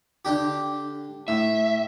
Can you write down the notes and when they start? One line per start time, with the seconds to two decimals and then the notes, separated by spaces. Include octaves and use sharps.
0.25 D3 D4 G4
1.28 A2 E5